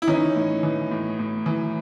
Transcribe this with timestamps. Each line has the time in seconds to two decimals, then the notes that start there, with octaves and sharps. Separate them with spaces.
0.02 E4
0.07 E3 C#4 D#4
0.36 A2
0.63 E3
0.91 A2
1.19 A2
1.46 E3